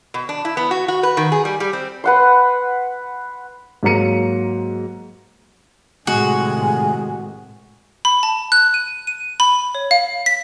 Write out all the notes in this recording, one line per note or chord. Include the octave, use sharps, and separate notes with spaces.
B2
D4
E4
B3
F#4
F#4
B4
D#3
G#4
G3
G3
C4
B4 F#5 C6
G#2 F#3 A#3 A#5 C#7 D#7
A2 C3 D#3 G#3 F#4 G#5
B5
A5
F#6
D#7
D#7
B5
C#5
F5
B6